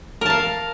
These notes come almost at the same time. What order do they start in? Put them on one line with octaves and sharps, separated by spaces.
A#4 A5 F5